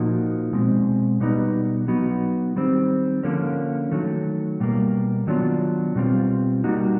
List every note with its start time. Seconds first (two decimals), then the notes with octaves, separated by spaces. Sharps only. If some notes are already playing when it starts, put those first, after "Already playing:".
Already playing: A#2 F3 A#3 D#4 F#4
0.53 B2 G#3 C4
1.20 B2 G3 B3 D#4
1.88 F#3 B3 D#4 F#4
2.56 D#3 G3 C4
3.23 D3 F3 A#3 C#4
3.92 D#3 F#3 A3
4.60 B2 G3 A#3
5.27 D#3 F#3 B3 D4 F4
5.96 B2 G3 C4 F4
6.64 G3 A#3 D#4 F#4